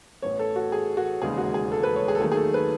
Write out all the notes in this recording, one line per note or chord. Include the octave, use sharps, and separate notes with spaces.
A1 A2 E3 B3 C#5
A4
F#4
G#4
F#4
E1 D#2 C#3 G#3 D#4 G#4
F#4
G#4
A4
B4
C#5
G#4
A4
D#2 D#3 F#3 A3 D#4 G#4
G#4
A4
B4